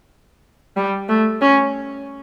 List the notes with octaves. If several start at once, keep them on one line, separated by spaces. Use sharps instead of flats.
G3
A3
C#4